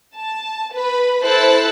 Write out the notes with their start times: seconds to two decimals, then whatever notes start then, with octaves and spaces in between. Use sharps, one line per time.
0.15 A5
0.73 B4 B5
1.23 E4 A4 C5 E6 F#6 A6